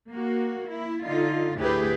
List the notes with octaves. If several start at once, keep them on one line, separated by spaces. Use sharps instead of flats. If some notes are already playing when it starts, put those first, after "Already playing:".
A#3 F#4
E4
D3 D#4 F4
D2 A2 E4 G4 G#4 B4